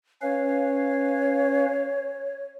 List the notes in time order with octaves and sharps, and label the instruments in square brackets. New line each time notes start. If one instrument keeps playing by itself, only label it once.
[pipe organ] C#4 B4 F5 [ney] C#5